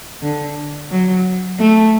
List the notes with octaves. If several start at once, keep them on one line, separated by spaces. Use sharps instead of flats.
D3
F#3
A3